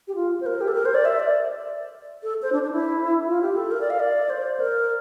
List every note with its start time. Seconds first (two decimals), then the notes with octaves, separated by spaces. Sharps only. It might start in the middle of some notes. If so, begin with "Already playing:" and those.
0.08 G4
0.15 F4
0.41 C5
0.46 A#4
0.61 G4
0.68 A4
0.75 A#4
0.85 C5
0.95 D5
1.05 E5
1.20 D5
2.23 A4
2.42 C5
2.52 D4
2.63 D4
2.72 E4
3.27 F4
3.42 G4
3.56 A4
3.71 A#4
3.81 D5
3.90 F5
4.00 D5
4.30 C5
4.60 A#4